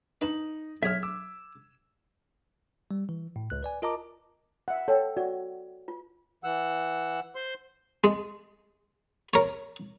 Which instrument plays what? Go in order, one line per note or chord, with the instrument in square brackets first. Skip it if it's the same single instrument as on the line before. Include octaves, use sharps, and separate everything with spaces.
[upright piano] D#4 F#7 [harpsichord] B4 A5
[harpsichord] B1 G#4 [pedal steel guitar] C#5 E5 [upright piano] F6 G#6
[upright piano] D6 [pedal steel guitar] E6
[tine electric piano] G3
E3
A2
C#2 F#6
B4 D5 G#5
F4 A#4 D#5 A5 A#5 D6
[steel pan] E5 F#5
[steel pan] A4 [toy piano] C#5 G5
[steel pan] F#4 [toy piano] D5
[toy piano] F4
[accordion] E3 F#5 E6
C5 C6
[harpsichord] G#3
A#4 C#5